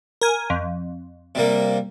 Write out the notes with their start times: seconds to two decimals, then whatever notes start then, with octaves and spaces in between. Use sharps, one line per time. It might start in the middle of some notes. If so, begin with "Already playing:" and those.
0.21 A#4 G#5
0.50 F2
1.35 C3 G3 A#3